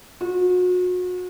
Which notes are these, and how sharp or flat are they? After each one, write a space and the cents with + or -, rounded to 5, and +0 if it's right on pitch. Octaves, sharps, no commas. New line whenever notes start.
F#4 -35